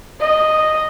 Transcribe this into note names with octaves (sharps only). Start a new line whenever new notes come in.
D#5